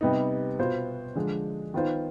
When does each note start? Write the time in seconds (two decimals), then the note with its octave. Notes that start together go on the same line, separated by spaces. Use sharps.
0.01 C3 G3 B3 D#4
0.59 B2 B3 F4 C5
1.15 D3 F3 G#3 D4 G#4
1.74 D#3 B3 F4 C5